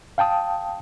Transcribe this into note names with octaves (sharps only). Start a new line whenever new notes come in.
F5 G5 A5 D#6